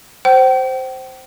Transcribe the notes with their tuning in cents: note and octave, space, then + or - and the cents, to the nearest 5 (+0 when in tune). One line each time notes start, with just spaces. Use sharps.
C5 +0 G5 -40